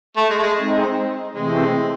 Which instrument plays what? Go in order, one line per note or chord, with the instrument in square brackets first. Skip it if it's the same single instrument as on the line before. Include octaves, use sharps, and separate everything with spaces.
[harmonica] A3
G#3
A3
G#3
[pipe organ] G#3 C4 D#4
[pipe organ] C3 E3 A3 C4 [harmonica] G#3